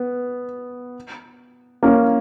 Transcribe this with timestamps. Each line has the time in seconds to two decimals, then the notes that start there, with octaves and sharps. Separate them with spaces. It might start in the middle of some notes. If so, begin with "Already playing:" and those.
Already playing: B3
1.83 A#3 C#4